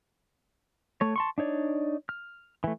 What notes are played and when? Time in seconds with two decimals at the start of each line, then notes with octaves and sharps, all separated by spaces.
1.01 A3 C#5
1.16 A5 C6 C#6
1.38 D4 D#4 C#5 D5
2.09 F6
2.64 E3 A3